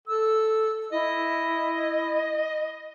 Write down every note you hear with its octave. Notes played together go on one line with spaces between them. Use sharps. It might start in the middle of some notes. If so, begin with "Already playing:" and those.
A4 E6
E4 D#5